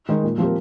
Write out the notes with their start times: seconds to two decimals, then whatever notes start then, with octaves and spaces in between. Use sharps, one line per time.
0.09 D#3 G#3 D#4
0.24 A#2
0.38 F3 C4 G4 A#4